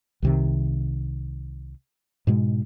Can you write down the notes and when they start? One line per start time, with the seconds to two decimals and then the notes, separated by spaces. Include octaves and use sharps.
0.22 C2 C3 D#3
2.27 G#2 B2 G#3